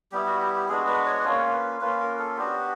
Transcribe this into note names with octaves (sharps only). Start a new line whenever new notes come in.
G3 B3 E4 G4
F#4
G4
G4
G#3 B3 D4 F#4 G#4
B4
C#5
A#3 C#4 F4 C#5
B4
A#3 C#4 F4 B4
A#4
A4
B3 D4 F#4 G4